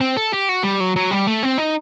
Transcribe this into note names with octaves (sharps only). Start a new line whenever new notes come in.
C4
A4
G4
F#4
G3
F#3
F#3
G3
A3
C4
D#4